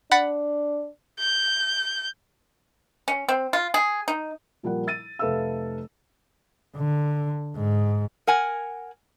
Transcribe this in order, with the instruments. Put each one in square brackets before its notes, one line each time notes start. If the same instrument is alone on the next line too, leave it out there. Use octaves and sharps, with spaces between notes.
[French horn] D4 [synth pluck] F#5 B5 A6
[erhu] G6
[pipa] C#4
C4
F4
G#4
D#4
[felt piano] A#2 F3 G3 A#3 A#4 F#5
E6 A6 D#7
F1 A4 B4 E5 F5 E6
[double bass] D3
G#2
[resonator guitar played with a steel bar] A#4 F#5 G#5